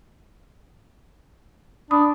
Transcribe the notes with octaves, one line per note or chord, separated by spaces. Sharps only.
D4 A5 B5 D#6